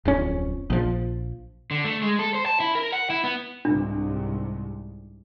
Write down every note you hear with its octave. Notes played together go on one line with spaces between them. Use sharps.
D1 F2 C#4
A#1 F3
D3
A3
G#3
A4
C5
A5
E4
A#4
F#5
E4
B3
C2 G#2 C3 D4